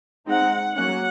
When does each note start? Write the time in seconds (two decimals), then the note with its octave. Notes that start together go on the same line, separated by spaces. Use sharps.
0.27 G#3 C4 D#4 F#5
0.75 F#3 A#3 C#4 F#5